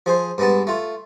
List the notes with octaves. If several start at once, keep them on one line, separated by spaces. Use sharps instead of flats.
F3 G#4 C5
G2 G#3 B3 A5
A3 F4